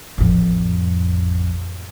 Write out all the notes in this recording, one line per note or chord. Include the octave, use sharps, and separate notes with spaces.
A1 F2